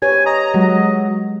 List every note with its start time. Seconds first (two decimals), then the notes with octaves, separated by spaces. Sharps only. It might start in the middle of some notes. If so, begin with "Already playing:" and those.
0.02 G4 B4 C#5 G#5
0.26 D#5 A#5
0.54 F#3 G#3